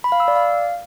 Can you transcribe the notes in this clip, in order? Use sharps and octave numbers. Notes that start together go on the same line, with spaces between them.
B5
F5
E6
D5
F5